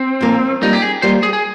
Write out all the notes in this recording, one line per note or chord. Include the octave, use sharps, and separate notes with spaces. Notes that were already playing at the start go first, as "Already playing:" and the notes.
Already playing: C4
A#2 F3 A#3
G3 A#3 D#4 F4
G4
G#4
G3 A#3 F4 C5
G#4
G#4